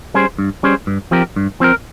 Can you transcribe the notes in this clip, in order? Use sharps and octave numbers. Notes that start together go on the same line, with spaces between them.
G3 C#4 G#4 C5
G2
G3 C#4 G#4 C5
G2
F3 C4 G4 A#4
G2
F3 C4 G4 A#4